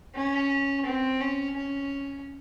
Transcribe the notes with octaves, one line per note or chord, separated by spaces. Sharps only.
C#4
C4
C#4
C#4